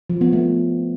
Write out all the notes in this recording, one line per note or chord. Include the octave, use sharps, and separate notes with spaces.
F3
B3
A3